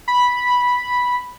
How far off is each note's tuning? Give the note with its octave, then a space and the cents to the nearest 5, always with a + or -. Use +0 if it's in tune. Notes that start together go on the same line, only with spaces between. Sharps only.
B5 -5